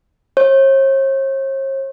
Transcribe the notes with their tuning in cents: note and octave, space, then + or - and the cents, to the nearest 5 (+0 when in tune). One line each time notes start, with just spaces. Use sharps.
C#5 -45